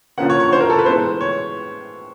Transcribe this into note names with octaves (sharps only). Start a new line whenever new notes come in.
D3 F3 A#3 C#4 F#5
C#5
C#5
C5
A#4
A4
B4
A2 E3 G#3 B3 C5
C#5